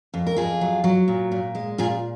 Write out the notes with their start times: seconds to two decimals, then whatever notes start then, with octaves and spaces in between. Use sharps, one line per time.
0.14 F2
0.27 A#4
0.36 F2 F4 G#4
0.61 F#3
0.84 F#3
1.08 A#2
1.31 A#2
1.55 G#3
1.78 A#2 F4 G#4